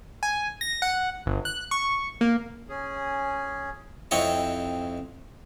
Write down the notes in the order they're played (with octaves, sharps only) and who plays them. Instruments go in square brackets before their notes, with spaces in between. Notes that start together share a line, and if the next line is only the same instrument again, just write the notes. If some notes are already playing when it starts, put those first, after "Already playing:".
[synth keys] G#5
A#6
F#5
G1
F#6
C#6
A#3
[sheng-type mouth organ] C#4 G#4
[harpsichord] F2 C4 E4 C#5 D#5 C#6